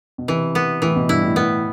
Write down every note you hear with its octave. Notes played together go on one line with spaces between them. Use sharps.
B2
C3 E3
B3
A2 E3
B2
G2 E4
A2
A2 B3